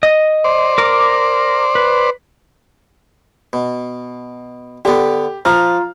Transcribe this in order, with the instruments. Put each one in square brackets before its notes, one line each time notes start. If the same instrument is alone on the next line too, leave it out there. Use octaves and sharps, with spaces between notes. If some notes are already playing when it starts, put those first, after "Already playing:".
[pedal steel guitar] D#5
[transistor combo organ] C5 D5
[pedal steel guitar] A#4 D6
B4
[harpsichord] B2
[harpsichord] D3 B3 [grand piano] G4
[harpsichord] F3 [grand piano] F4 A#5 F6